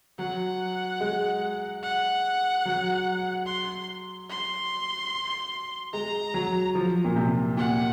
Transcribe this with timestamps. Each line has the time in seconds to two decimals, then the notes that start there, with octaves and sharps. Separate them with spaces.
0.19 F#3 F#5
1.01 G#3
1.83 F#5
2.65 F#3
3.47 C6
4.30 C6
5.93 G#3 A#5
6.34 F#3
6.75 F3
7.05 A#2
7.16 C3
7.57 A#2 F#5